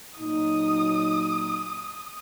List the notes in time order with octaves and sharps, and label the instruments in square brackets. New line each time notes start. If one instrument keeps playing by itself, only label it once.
[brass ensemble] A#2 F#3 D#4 [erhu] D#6